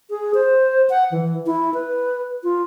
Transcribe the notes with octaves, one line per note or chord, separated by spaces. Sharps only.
G#4
C5
F#5
E3
E4
B4
F4